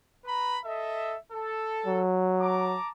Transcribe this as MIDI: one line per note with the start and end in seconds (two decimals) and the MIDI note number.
0.25 0.58 71
0.25 0.58 82
0.25 0.58 83
0.64 1.15 69
0.64 1.15 75
0.64 1.15 76
1.32 2.01 69
1.86 2.77 54
2.39 2.88 81
2.39 2.88 82
2.39 2.88 86